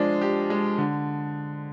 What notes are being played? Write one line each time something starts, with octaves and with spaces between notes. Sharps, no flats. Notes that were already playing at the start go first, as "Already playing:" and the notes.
Already playing: F3 G#3 D4
G4
G#3
D3